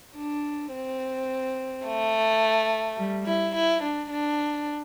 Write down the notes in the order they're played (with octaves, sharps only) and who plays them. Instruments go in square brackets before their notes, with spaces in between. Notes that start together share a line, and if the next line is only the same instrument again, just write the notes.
[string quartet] D4
C4
A3
G3
E4
E4
D4
D4